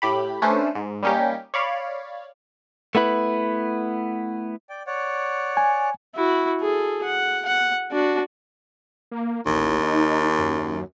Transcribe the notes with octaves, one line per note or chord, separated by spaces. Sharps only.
A2 G4 B5
A3 C#4 D4 B4 C5
G#2
G3 A#3 C#4 D#4 G4
C#5 D5 F5 B5
A3 B3 E4 B4
D5 G5
C#5 D5 F#5
G#5
E4 F#4
G#4 A4
F#5
F#5
D4 F#4
A#3
A1 D#2
D#4
F#2